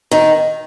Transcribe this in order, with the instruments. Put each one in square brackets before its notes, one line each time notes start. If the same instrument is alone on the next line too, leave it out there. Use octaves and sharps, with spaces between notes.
[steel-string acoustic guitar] D#3